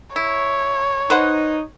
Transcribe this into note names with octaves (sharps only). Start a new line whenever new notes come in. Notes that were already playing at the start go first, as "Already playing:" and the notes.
E4 C#5
D#4 B4 C5 F#5